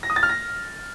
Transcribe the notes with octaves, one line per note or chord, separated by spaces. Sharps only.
A#6
D#6
A6
F6
A#6